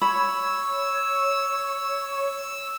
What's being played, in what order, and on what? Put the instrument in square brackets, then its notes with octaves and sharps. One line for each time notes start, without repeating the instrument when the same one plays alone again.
[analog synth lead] C#5 [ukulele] B5 [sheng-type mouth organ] E6